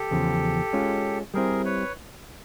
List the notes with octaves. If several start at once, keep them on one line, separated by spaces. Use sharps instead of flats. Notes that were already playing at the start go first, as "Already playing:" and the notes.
Already playing: G4 A4
E2 C#3 F3
G#3 C#4 F4
G3 C4 E4 G#4 A#4
B4 C#5